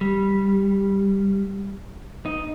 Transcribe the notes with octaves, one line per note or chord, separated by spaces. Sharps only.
G3
D#4